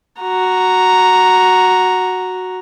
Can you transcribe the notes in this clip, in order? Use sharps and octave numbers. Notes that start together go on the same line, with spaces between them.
F#4 A#5